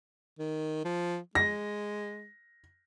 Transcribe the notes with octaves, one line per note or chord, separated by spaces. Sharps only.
D#3
F3
G#3 A#6